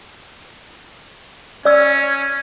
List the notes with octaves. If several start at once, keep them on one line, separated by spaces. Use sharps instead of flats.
C#4 D5 E6